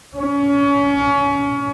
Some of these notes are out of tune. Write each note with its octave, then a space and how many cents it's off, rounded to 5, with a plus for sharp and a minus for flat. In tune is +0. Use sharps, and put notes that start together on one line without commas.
C#4 +30